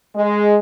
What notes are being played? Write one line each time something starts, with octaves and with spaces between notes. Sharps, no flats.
G#3